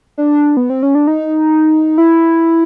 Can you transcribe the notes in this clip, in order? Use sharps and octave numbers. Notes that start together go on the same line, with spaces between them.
D4
B3
C4
C#4
D4
D#4
E4